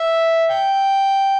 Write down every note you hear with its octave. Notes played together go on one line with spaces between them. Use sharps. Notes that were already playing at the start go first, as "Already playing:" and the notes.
Already playing: E5
G5